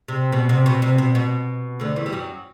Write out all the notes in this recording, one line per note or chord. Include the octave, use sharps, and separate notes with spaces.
C3
B2
C3
B2
C3
B2
B2
D2 D3
E2 E3
G3
F#2 F#3